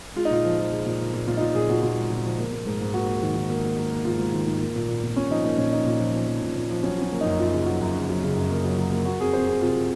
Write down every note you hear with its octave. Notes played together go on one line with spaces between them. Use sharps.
G#3 F4
D#4
A#2 F4
F3
F3
G#3
A#2
A#2
A#2
A#2 F4
D#4
A#2 F4
A#2 G#4
A#2 F#4
A#2 F4
G#3
A#2
F3
A#3
A#3
G#2
G#2
A#3 F#4
A#3
D#3
D#3
A#3
A#3
A#3
A#3
G#2 F4
G#2
D#3
G#2
A#3
A#2
A#2
A#2
A#2 C#4
F3 D#4
A#3 D#4
A#2 C#4
F3 D#4
A#2
F3
F3
F3
A#2
A#2
F3
F#3 C#4
F#3 C#4
A#3
F#2 D#4
F#2 F4
C#3
F#3
F#2
C#3
F#3
C#3
F#2
A#3
F#3
F#3
A#3
A#3 F#4
F2 G#4
F2 C5
F2 G#4
C3 F4